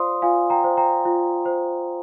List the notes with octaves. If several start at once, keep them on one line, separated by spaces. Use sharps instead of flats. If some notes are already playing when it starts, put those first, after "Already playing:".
Already playing: F4 C5 D5 F5 C6 D#6
F4 F5 G#5
G5 A#5
C5
G5 A#5
F4
C5